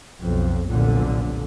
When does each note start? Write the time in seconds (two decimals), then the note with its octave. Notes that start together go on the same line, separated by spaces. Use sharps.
0.21 B1 F2
0.66 F1 B1 A#2 D3